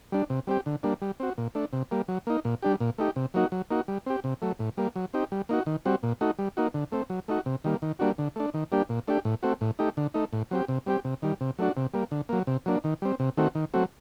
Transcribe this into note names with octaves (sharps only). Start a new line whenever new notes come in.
G3 D4
C3
G3 C4 G4
D3
G3 A#3 D4
G3
C4 F#4
A#2
A3 D4
C3
G3 A#3
F#3
A#3 D#4
A#2
G3 D4 G4
A#2
A3 D#4 G4
C3
F#3 A#3 D#4 F#4
F#3
A#3 D#4 F#4
G3
C4 G4
C3
F#3 A3
A2
G3 A#3
F#3
C4 D#4 G4
G3
A#3 D#4 F#4
D#3
G3 C4 F#4
A#2
A3 D#4 F#4
G3
A#3 D#4 F#4
D3
A3 C4
F#3
A3 D#4 F#4
C3
D#3 G3 A#3
D#3
G3 A#3 D4 F#4
D3
A3 D4
D#3
G3 A#3 D4 G4
A#2
A3 D4 G4
A2
A3 C4 F#4
A2
A3 D#4 G4
D3
A3 D#4
A2
F#3 C4 G4
C3
G3 C4 G4
C3
D#3 G3
C3
F#3 A3 D4 F#4
C3
G3 A#3
D3
F#3 A#3
C3
F#3 A#3 D4
D#3
G3 C4
C3
D#3 A3 C4 F#4
D#3
F#3 A3 C4 F#4